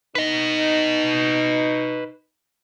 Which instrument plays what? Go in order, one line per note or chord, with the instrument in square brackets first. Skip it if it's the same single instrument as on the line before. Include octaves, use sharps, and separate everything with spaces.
[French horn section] D#4 [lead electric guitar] B4 D#5